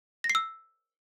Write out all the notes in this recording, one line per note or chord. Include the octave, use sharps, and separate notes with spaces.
A#6
C7
E6